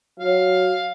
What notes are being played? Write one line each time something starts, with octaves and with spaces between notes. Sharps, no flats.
F#3 F5